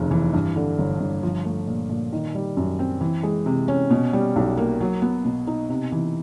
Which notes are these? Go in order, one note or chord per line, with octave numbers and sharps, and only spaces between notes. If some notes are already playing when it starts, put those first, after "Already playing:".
Already playing: F1 D#2 C#3
E3
G2
D3
G1
G1
F3
A3
A#2
A#2
D#3
G3
F#2
C4
E3
G#3
C3
C#4
B2
G3
B1
A#3
F#3
B3
B2
D#4
C3
E3